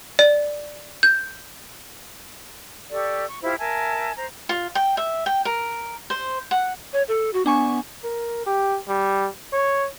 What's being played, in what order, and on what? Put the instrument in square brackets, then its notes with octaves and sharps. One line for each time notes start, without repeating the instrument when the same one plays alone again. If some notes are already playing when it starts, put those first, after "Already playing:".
[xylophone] D5
G6
[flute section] G4 A4 D5 C#6
C#6
E4 F4 G4 C5
A#4 E5 G#5 A5
C5 A#5
[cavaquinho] F4
G5
E5
G5
A#4
C5
F#5
[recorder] C#5
A4
F#4
[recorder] B3 [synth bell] D4 G#5 C#6
[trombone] A#4
G4
G3
C#5